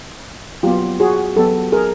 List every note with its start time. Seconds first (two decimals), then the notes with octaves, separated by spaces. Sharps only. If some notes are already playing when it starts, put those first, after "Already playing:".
0.63 F#3 B3 F4 G4
1.00 F#4 G#4
1.36 F#3 B3 G4 A4
1.72 G#4 A#4